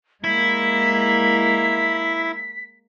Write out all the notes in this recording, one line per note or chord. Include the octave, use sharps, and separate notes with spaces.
G#3 A#3 E4 B6